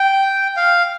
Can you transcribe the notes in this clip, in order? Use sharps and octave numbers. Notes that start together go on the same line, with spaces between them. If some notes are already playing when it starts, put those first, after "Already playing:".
Already playing: G5
F5